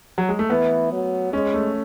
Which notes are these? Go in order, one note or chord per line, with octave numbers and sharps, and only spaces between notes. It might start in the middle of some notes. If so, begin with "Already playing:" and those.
F#3
G#3
A3
E3 B3
F#3
G#3 C#4
A3